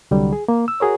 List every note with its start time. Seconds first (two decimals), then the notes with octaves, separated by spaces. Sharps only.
0.11 C2 D3 F#3 G3
0.33 G#4
0.48 A#3
0.68 E6
0.80 F#4 G#4 A#4 C#5